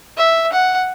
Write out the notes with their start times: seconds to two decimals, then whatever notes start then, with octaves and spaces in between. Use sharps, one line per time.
0.17 E5
0.52 F#5